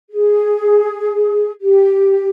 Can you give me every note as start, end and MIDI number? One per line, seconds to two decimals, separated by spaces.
0.09 1.50 68
1.60 2.29 67